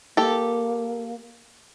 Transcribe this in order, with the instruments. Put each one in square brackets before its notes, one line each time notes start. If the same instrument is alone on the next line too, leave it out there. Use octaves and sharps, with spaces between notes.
[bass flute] A#3 [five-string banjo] G4 A4